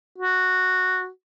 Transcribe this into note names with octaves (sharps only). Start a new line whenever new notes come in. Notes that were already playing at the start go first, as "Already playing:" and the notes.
F#4